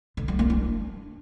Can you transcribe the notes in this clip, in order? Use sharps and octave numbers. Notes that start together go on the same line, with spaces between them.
D3
G3
A#3
D4